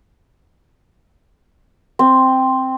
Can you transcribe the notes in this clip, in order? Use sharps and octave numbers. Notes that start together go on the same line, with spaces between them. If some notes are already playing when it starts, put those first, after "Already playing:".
C4